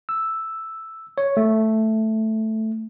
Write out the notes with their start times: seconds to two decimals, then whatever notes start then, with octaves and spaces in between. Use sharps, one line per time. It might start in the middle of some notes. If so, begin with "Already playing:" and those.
0.09 E6
1.18 C#5
1.37 A3